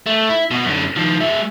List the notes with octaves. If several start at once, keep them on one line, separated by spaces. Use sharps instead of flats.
A3
E4
B2 F#4
F#2 D3
D#3 F3
G#3 E5